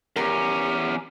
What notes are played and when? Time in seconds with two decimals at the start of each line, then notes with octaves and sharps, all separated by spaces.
0.16 E2 C#4 G4 A#4